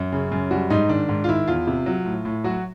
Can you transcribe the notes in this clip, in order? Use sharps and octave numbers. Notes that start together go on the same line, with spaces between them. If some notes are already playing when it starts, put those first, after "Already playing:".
Already playing: F#2
C#3
F#2
G3 F#4
G#2 D#4
D#3 D4
G#2
F4
D#3 E4
E2 F4
C3
F#3
A2
A2
F#3 F#4